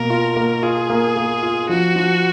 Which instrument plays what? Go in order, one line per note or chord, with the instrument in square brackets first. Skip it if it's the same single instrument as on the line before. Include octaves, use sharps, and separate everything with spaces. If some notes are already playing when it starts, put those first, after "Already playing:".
Already playing: [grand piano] B2 A#3 [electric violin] A#4
[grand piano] F4
A#3
[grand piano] F4 [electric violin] G#4
[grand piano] A#3
A#3
F4
[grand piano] F3 [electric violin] F#4
[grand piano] F3